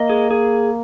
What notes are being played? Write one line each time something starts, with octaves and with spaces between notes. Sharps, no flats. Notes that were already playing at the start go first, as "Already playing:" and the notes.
Already playing: A#3 D#5
G#4
G#4